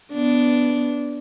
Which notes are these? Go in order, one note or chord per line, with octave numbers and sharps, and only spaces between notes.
B3 D4